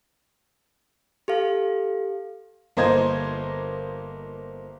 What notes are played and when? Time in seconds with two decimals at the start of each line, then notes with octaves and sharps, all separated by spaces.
1.28 G4 A4 F5
2.77 G1 A#3 A#4 C5 D#5 G#6